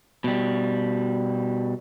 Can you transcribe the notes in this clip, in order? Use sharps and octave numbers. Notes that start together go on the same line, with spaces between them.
B2 G3